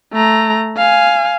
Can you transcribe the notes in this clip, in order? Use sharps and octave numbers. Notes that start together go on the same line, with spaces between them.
A3 A#5
F5 G#5